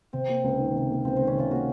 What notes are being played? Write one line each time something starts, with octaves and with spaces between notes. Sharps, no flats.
C3 C4
A#3
C#2
D#3
C3
A#3
C#2 C4
D#3 C4
C#4
C3 F4
A#3 F#4